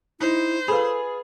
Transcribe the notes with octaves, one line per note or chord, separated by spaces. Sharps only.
D#4 E4 C5
F4 G#4 A4 B4 B5